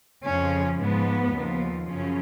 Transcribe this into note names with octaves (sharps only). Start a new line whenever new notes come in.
F2 C#3 F3 C#4
G#2 F3 B3
D#2 C#3 F3
F#2 C#3 F3 C#4